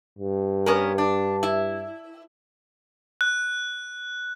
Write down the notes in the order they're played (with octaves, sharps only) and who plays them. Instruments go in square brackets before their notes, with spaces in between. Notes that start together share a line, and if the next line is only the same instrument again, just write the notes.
[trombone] G2
[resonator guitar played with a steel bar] B3 C#4 A#4
D4
E4
[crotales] F#6